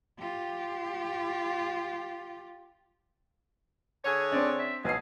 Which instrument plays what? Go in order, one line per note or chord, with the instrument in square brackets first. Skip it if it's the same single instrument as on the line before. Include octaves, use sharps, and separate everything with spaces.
[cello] F4 G4
[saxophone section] D3 G#4 C#5 [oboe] G#5
[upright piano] C4 D4 [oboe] D5
[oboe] E5
[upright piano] B1 C7 [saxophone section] B2 [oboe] G#4